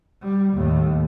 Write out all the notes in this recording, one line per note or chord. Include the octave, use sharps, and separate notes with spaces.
G3
D#2 A2